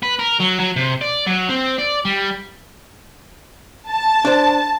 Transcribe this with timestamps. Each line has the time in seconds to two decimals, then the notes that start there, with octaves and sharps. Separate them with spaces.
0.03 B4
0.19 A#4
0.40 F#3
0.59 F#3
0.76 C3
1.02 D5
1.26 F#3
1.49 C4
1.78 D5
2.05 G3
3.90 A5
4.25 D4 C5